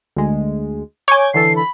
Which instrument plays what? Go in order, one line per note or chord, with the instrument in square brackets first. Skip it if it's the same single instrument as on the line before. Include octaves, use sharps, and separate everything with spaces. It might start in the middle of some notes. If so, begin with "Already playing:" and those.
[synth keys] D2 G#3
[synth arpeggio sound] C#5 G#5 [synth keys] D6 G6 G#6
[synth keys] D3 E3 A4 [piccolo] C7
[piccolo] B5